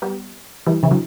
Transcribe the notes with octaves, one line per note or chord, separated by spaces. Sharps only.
G3 B3
E3 G3
C#3 E3
D3 F#3